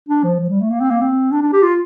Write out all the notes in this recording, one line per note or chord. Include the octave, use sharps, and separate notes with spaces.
D4
F3
F3
G3
A3
A#3
C4
A#3
C4
D4
D4
G4
F4